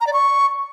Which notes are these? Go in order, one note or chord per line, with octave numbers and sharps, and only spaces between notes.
A#5
D5
C#6